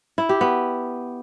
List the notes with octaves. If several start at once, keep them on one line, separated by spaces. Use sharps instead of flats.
E4
G4
B3